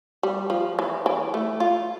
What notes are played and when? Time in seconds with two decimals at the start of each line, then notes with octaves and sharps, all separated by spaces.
0.23 G3
0.50 F3
0.79 E3
1.06 E3
1.34 A3
1.60 F4